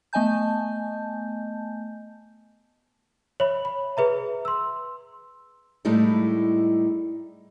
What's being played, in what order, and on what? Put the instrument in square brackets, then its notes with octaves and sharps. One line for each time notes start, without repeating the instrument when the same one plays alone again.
[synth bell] A3 B3 D#5 G#5 A5 G6
[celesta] C#5 E5 B5
B5
G#4 B4 E5 A#5
C6 E6
[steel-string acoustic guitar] A2 G3 G#3 D#4 E4